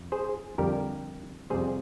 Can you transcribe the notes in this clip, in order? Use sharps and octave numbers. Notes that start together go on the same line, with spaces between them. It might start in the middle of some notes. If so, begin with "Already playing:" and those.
Already playing: F2
G#4 C5
F2 D3 G3 G4 A#4
F2 C3 G3 G#4 C5